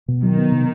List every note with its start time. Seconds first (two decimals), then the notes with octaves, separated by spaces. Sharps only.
0.08 B2
0.23 D#3 F#3
0.38 B3
0.52 C3